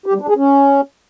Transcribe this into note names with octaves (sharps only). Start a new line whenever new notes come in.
G4
G3
D4
G#4
C#4